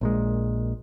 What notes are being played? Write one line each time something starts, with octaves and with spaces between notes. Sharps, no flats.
A#1 A#2 G#3